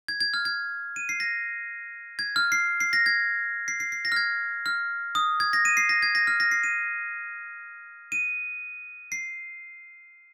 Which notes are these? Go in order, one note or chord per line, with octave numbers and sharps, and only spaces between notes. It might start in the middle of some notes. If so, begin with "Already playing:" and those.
G#6
G#6
F6
G#6
D#7
C7
A#6
G#6
F6
C7
C7
A#6
G#6
C7
C7
C7
A#6
F6
G#6
F6
D#6
G#6
A#6
D#7
C7
A#6
G#6
A#6
F6
A#6
C7
D#7
D#7
C7